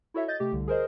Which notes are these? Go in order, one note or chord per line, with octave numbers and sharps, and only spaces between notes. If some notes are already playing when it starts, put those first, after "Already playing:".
E4 F#4 A4 C#5 E5
D#5 G6 A6
C3 A3 G4
C2 D3
G#4 A#4 C5 D#5